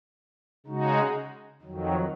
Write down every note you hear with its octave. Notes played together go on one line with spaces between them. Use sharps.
C#3 G#3 D#4 F#4
F2 D#3 F#3